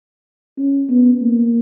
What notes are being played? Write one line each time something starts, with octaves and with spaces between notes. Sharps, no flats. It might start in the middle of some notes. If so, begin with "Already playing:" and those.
C#4
B3
A#3